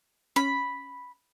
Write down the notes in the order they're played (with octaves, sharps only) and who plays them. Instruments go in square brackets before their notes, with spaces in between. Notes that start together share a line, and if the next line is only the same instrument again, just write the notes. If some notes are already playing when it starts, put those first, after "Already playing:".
[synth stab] C#4 [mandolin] B5